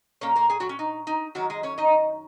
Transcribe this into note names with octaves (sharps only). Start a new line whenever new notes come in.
A#2 A#3 C#4 C#5
A#3 A#4
G#4 G#5
F#3 F#4
C#4
D#4
D#4
F#2 D#3 F#3 G#3 F#4
G#3 G#4
C#4 C#5
D#4 D#5